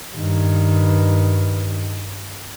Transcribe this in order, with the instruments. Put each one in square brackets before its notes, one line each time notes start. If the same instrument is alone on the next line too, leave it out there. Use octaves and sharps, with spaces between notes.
[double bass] G2 D#3